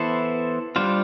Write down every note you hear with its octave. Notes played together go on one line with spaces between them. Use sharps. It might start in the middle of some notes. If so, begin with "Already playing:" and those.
Already playing: E3 B3 E4 A4 C5
G3 D4 F4 C5